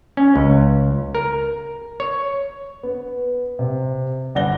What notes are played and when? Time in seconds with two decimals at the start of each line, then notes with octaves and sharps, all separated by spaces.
0.17 C#4
0.36 C#2
1.15 A#4
2.00 C#5
2.83 B3
3.59 C3
4.35 G1 D5 F#5 A#6 G7